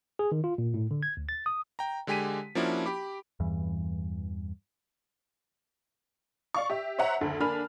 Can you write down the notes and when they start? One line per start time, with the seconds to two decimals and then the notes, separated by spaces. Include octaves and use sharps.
0.19 G#4
0.32 D#3
0.44 F4
0.58 A#2
0.74 A2
0.91 D3
1.03 G#6
1.17 D2
1.29 A6
1.46 D#6
1.79 G5 A#5
2.07 D3 G#3 G4 G#5 B6 D#7
2.55 F3 A#3 C#4 D4 E4 F#4
2.86 G4 B5 D6
3.40 E2 G2 E3
6.54 D5 F5 C#6
6.70 G4 E5
6.98 C5 C#5 E5 F#5 A#5
7.21 F#1 D2 D3
7.40 D3 A#3 D4 G#5 B5 F6